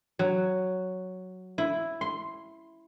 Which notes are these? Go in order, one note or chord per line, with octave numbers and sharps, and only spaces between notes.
F#3
E4
C6